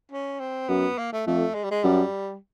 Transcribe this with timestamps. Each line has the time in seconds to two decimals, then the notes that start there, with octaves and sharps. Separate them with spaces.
0.12 C#4
0.40 C4
0.69 F#2 B3
0.98 A#3
1.13 A3
1.27 F2 A3
1.55 G#3
1.64 G3
1.71 G#3
1.84 F#2 G3